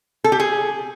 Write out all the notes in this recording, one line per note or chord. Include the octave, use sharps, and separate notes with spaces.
A4
G4
G#4